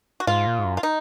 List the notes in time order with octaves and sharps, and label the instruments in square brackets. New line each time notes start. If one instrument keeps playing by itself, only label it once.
[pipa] F#4
[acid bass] G#2 [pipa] F4
[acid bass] A#2
G#2
F#2
[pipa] F4
D#4